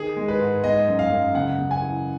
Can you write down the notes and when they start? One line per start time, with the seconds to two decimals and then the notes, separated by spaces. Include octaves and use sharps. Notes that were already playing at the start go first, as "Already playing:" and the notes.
Already playing: D#3 G#4
0.17 G#3
0.28 B4
0.40 G#2
0.64 G#3 D#5
0.88 F#2
0.99 F5
1.11 F#2
1.35 C#3 F#5
1.58 C#3
1.71 G#5
1.82 E3